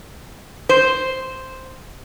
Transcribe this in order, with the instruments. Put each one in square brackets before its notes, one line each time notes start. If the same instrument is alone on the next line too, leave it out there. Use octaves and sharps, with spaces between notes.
[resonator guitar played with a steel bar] C5